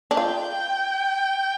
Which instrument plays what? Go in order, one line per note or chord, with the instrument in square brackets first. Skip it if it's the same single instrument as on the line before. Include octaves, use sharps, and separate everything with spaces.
[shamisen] D4
[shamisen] F4 [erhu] G5